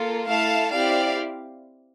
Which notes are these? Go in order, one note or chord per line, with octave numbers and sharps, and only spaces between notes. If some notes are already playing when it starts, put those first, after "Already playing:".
Already playing: A#3 F4 A4
A3 E4 A4 F5 A5
C4 E4 G4 D5 F5